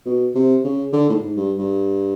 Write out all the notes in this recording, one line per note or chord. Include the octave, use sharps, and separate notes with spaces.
B2
C3
C#3
D3
A2
G#2
G2
G2